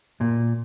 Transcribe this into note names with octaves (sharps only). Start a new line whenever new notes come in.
A#2